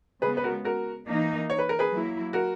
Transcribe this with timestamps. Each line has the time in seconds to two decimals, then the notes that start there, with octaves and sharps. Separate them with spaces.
0.22 C#3 G#3 B3 G#4 B4
0.37 B4
0.44 F#4 A#4
0.64 F#4 A#4
1.07 E3 A#3 D#4
1.50 C#5
1.59 B4
1.69 A#4
1.79 G#4 B4
1.92 F#3 A#3 E4
2.33 F#4 A#4